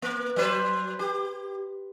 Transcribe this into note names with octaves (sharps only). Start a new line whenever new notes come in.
A#3
F#3 B4 C5
G4